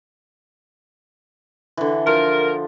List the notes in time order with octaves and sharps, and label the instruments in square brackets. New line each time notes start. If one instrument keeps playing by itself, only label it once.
[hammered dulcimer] D3 E3
[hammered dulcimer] F3 [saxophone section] A#4